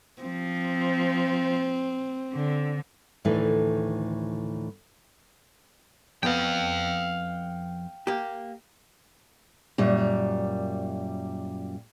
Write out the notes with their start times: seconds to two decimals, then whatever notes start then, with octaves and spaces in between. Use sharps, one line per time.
0.23 F3 C4
2.34 D3
3.25 D2 A2 D#3 E3 A3
6.23 F2 B3 F5 G5
8.07 A#3 G4
9.78 F#2 A#2 G3